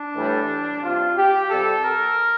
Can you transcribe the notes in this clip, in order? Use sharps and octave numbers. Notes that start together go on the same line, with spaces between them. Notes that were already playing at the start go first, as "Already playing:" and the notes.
Already playing: D4
A2 E3 G3
C3 G3 F4
G4
C3 G3 A4
A#4